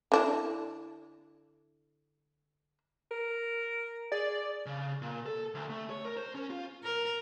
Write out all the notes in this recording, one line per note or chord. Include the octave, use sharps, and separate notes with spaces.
D3 D4 E4
A#4
G#4 D5
C#3
A#2
A4
D2
A3
C#5
A#4
C5
C#4
F4
A#4